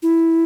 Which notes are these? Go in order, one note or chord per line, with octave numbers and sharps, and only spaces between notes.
E4